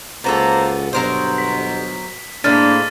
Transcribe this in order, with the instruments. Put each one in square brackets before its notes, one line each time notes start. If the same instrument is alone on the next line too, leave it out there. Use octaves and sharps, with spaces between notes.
[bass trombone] C#2 [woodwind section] A#3 C5 A#5 [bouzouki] B3 F#4 A4
[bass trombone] G1 [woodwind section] B2 B3 [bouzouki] F#3 A#4 C5
[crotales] B6
[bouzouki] A2 G#3 C5 [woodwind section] A#3 [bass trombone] D4 [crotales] F6 A6 D#7